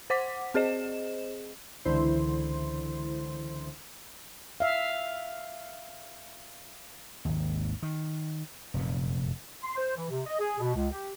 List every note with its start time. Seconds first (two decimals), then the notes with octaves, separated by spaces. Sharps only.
0.10 C5 F#5 D6 B6
0.54 C4 G#4 C5 D#5 E7
1.85 C#2 D3 E3 E4 C5 C6
4.60 E5 F5
7.25 G#1 D#2
7.83 D#3
8.74 F1 F#2 A#2
9.64 C6
9.77 C5
9.97 E3
10.10 C3
10.26 D#5
10.39 G#4
10.59 B2
10.75 C#2
10.92 G4